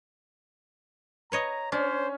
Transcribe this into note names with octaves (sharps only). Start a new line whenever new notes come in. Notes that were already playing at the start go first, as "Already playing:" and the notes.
B4 C#5 D#5 A#5
C#4 D4 C5